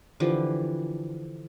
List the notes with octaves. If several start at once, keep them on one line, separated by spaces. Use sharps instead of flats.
D3 E3 F3 G4